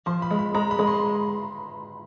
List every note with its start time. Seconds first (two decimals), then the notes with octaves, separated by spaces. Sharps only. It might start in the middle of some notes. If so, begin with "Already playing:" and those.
0.06 F3 C6
0.22 B5
0.31 G#3
0.39 B5
0.54 G#3 A#5
0.71 B5
0.79 G#3
0.87 C6